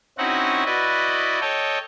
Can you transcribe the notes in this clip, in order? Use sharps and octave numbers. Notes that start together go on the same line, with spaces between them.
C4 C#4 D#4 E4 F#4 F#5
E4 F#4 B4 D5 D#5
A4 C#5 D#5 G5